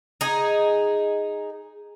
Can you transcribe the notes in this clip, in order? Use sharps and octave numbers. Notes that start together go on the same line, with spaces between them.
D#4 G#4